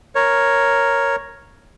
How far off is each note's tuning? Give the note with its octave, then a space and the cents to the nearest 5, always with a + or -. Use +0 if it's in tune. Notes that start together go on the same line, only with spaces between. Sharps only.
A#4 +0 C#5 +0